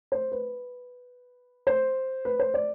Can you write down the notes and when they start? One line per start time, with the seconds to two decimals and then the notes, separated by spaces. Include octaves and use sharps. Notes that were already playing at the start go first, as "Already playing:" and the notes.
0.12 C5
0.32 B4
1.67 C5
2.25 B4
2.39 C5
2.54 D5